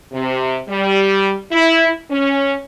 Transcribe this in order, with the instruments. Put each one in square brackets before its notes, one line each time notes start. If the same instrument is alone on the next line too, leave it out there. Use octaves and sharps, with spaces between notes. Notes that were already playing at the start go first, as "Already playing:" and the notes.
[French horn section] C3
G3
E4
C#4